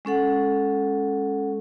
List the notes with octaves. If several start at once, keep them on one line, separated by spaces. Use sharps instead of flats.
G#3 C#4 A4 F#5